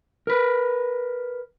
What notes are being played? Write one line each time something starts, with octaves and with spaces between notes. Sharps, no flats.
A#4 B4